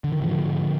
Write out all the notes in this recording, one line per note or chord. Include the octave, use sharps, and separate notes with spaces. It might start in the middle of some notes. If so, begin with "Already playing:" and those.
D3
D#3
G#2 D3 F3
G#2